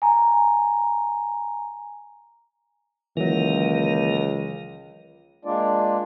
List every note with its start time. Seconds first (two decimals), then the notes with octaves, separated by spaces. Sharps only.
0.02 G#5 A#5
3.17 C#2 D#3 E3 F#3 A#3 A#4
5.45 G#3 A#3 D4 F4 D5